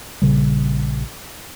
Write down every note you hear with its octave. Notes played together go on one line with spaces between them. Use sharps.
A#1 C#3 G3